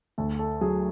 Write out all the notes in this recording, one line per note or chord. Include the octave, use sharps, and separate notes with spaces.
D2 A4
A4
F#3 G#4